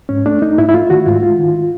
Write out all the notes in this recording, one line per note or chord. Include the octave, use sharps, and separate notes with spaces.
G#2 C#4
A3 D4
A3 D#4
G#2 E4
E4
A3 F4
D#3 F#4
G#2 F4
G#3 F4
D#3